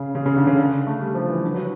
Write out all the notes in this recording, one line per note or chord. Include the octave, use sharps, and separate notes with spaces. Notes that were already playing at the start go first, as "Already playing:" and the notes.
Already playing: C#3
C#3
C#3
D3
C#3
D3
A3
G3
F3
E3
D3
F#3